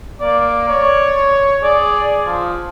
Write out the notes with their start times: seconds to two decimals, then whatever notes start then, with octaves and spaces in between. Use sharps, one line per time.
0.21 A#3 D5
0.69 C#5
1.63 G#4 D5
2.26 F3